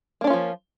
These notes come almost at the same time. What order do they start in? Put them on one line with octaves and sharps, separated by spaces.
A#3 D4 C#4 F4 F3